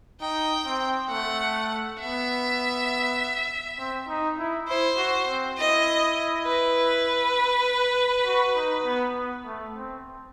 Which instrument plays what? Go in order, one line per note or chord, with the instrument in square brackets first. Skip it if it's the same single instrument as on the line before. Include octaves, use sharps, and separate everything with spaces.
[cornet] D#4 [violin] G5
[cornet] C4
[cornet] A3 [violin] F#5
[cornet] B3 [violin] E5
[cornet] C4
D#4
E4
[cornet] E4 [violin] C5
[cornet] F#4
C4
[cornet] E4 [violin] D#5
[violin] B4
[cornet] F#4
D#4
B3
B3
A3
C4